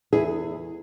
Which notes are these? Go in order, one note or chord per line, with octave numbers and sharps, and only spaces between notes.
E2 E4 G#4